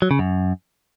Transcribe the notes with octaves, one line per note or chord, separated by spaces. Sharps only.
F#3
C#3
F#2